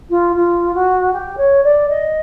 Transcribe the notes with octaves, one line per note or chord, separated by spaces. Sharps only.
F4
F4
F#4
G4
C#5
D5
D#5